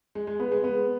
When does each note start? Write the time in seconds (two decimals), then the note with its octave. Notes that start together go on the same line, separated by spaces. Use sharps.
0.15 G#3
0.27 G#3
0.40 B3
0.51 G#3
0.64 B3